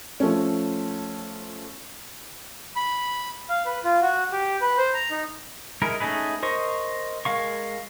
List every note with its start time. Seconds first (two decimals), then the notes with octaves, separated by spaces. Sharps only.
0.20 F3 A3 C#4
2.76 B5
3.49 F5
3.65 B4
3.84 F4
4.02 F#4
4.32 G4
4.61 B4
4.78 C5
4.94 A#5
5.11 D#4
5.82 G#3 D#4 E4 A#4
6.00 A3 C#4 D#4 G#4 B4
6.42 A#4 C5 D#5 C#6
7.25 G#3 A#4 F5 C#6